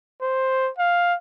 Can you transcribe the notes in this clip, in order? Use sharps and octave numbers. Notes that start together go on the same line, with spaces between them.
C5
F5